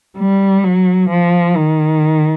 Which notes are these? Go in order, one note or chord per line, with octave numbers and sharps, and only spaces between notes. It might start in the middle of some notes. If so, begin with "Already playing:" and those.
G3
F#3
F3
D#3